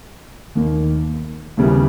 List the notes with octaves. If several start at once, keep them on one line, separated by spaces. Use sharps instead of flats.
D#2 D#3 A#3 D#4
D#2 C#3 G3 B3 E4